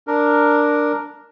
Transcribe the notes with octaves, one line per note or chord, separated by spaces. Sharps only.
D4 A#4